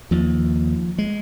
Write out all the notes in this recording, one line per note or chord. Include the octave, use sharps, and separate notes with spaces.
D#2 F3
G#3